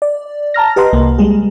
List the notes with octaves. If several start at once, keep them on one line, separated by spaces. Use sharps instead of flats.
D5
A5 A#5 F6 A#6
G4 B4 D#5 F#5 A#5 C6
C2 A#3
G3 G#3 G#4